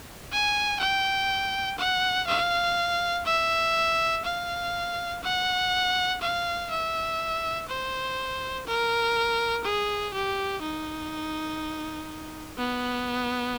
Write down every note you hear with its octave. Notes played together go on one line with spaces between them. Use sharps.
G#5
G5
F#5
F5
E5
F5
F#5
F5
E5
C5
A#4
G#4
G4
D#4
B3